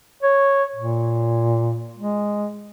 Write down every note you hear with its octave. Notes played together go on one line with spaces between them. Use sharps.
C#5
A#2
G#3